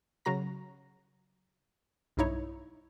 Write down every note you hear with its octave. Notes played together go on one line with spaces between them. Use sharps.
C#3 F#3 F#4 A#5 A#6
B1 G2 D#4 E4 C#5